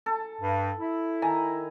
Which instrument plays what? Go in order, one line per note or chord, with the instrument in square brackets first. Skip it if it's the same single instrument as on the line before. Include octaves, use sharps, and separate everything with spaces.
[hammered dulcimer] A4
[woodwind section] G2
E4
[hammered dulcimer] D#3 G#5 A#5